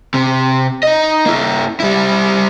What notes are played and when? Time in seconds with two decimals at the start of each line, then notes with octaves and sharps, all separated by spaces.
0.14 C3
0.83 D#4 D#5
1.26 A#3 E4
1.80 G3 E4